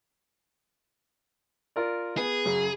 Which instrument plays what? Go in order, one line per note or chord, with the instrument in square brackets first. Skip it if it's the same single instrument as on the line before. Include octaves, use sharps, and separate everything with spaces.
[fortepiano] F4 A#4 D5
[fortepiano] B3 [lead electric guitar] G#4
[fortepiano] F#2 C#3